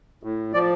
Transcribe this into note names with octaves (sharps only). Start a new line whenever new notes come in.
A2
F3 D5